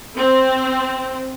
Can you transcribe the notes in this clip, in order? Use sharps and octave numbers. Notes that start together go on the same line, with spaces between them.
C4